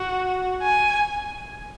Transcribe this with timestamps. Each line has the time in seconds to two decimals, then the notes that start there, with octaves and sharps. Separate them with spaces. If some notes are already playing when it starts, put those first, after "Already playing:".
Already playing: F#4
0.62 G#5